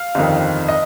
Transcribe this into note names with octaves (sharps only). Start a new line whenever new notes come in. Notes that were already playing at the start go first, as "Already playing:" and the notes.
Already playing: F5
G1 F2 D#3
D#5